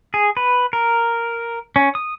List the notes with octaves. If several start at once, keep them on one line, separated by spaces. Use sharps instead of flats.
G#4
B4
A#4
C#4
D#6